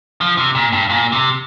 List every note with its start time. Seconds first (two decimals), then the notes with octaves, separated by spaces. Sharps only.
0.21 F3
0.37 C3
0.55 A#2
0.72 G2
0.90 A#2
1.12 C3